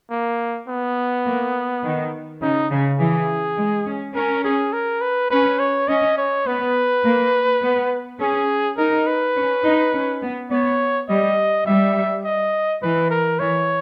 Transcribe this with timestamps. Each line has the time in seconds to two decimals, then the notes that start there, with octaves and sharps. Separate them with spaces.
0.11 A#3
0.68 B3
1.26 A#3
1.83 D#3
2.41 C#3 D#4
2.71 C#3
2.99 E3 G#4
3.57 G#3
3.86 C#4
4.15 C#4 A#4
4.45 G#4
4.73 A#4
5.01 B4
5.30 C#4 B4
5.59 C#5
5.89 C#4 D#5
6.18 C#5
6.46 B3 B4
7.04 A#3
7.63 B3
8.20 C#4 G#4
8.78 D#4 A#4
9.07 B4
9.36 C#4
9.64 D#4
9.93 C#4
10.22 B3
10.51 B3 C#5
11.09 G3 D#5
11.66 G3 E5
12.24 D#5
12.83 E3 B4
13.11 A#4
13.40 E3 C#5